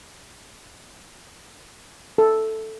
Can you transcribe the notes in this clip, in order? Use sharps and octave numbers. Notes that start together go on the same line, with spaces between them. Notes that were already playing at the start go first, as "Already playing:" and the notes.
A4